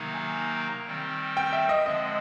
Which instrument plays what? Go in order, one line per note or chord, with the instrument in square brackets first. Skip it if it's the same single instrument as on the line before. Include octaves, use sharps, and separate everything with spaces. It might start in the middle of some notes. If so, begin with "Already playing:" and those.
Already playing: [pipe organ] C3 D#3 F#3 A#3 D#4
[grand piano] G#5
[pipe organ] D#3 G3 C4
[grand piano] G5
E5
D#5
[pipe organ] D3 F3 G#3 C4 [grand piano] D#5